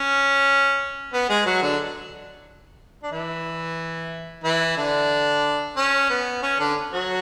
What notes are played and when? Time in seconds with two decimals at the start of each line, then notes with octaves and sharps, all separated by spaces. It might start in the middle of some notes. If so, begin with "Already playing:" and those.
Already playing: C#4
1.13 B3
1.30 G#3 G#4
1.46 F#3 F#4
1.62 D3 D4
3.03 D4
3.12 E3 E4
4.44 E3 E4
4.77 D3 D4
5.77 C#4
6.10 B3
6.43 C#4
6.59 D3 D4
6.93 F#3 F#4